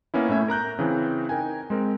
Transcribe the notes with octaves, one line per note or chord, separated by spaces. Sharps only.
A#3 B3 C#4 E4
A2 A3 C#4 E5 G#6
A#4 A#5 F#6 G6
C#3 E3 C4
D#4 A#4 G5 G#5
G#3 C4 A#4